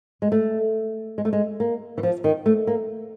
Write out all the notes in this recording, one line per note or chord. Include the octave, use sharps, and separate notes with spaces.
G#3
A3
G#3
A3
G#3
A#3
E3
F3
D#3
A3
A#3